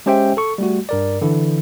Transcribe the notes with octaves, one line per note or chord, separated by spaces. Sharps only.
G#3 C#4 G4 C5 E5 G5
A4 C#6
G3 A3 F#4
G2 A#4 D5
D3 E3 E4